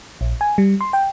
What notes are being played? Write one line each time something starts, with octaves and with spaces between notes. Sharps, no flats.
A#1
G#5
G3
C6
G5